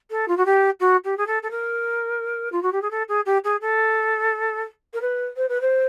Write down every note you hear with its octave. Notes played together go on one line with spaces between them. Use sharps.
A4
F4
F#4
G4
F#4
G4
G#4
A4
A4
A#4
F4
F#4
G4
G#4
A4
G#4
G4
G#4
A4
A#4
B4
C5
B4
C5